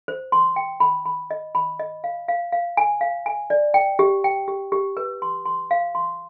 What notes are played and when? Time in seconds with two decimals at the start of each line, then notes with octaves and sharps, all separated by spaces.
0.08 C5
0.32 C6
0.56 G5
0.80 B5
1.06 B5
1.31 D#5
1.55 B5
1.79 D#5
2.04 F5
2.28 F5
2.52 F5
2.77 G#5
3.01 F5
3.26 G#5
3.50 D5
3.74 G5
3.99 G4
4.24 G5
4.48 G4
4.72 G4
4.97 B4
5.22 C6
5.46 C6
5.71 F5
5.95 C6